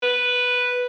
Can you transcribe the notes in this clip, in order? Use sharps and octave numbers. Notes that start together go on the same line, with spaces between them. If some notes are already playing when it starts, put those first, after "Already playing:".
B4